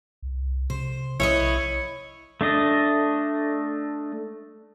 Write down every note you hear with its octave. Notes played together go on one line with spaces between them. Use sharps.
C2
C3 C5
B1 E4 B4 C#5 D#5
A3 D4 D#5